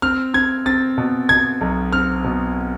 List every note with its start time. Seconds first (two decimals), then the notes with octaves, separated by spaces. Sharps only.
0.02 C4 F6
0.34 C4 G#6
0.66 C4 A6
0.98 B2
1.29 B2 G#6
1.61 B1
1.93 C4 F6
2.24 B2